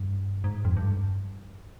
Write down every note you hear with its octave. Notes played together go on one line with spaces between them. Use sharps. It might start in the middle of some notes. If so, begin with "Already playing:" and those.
Already playing: G2
G#2
F2
G2